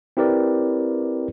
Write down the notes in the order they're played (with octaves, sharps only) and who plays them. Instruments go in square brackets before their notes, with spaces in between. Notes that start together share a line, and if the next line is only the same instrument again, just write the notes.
[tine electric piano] C4 E4 G4 A#4 B4 D5